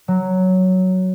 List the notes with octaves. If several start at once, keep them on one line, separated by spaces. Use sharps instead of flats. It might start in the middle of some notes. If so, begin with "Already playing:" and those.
F#3